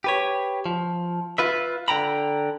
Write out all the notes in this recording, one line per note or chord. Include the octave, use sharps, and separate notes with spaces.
G4 B4 C#5
F3
F4 B4 E5
D3 G5 A#5 B5